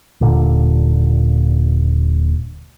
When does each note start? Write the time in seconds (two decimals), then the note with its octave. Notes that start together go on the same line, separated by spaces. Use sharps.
0.21 D#1 B1 A#2 D3